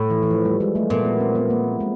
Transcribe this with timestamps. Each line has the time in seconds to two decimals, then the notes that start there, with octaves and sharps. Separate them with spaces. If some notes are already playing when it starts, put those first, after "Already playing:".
Already playing: A2
0.10 E3
0.22 E3
0.31 F3
0.45 G3
0.60 G#3
0.75 A3
0.90 A#2 B3
1.05 B3
1.20 C4
1.35 B3
1.50 A#3
1.80 G#3